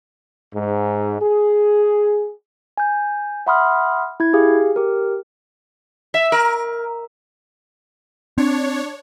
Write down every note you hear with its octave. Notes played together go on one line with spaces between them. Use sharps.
G#2
G#4
G#5 G6
E5 F#5 B5 C6 D#6 F6
E4 G#6
G4 G#4 F5
G4 A#4
E5
A#4
C4 D4 C#5